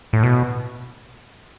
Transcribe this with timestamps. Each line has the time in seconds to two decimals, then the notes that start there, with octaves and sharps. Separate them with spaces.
0.13 A2
0.23 B2